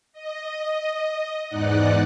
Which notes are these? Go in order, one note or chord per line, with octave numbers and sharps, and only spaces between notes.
D#5
E2 G#2 D#4 D5 F#5 F#6